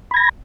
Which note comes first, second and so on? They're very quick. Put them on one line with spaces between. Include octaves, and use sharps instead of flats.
B5 G#6 A#6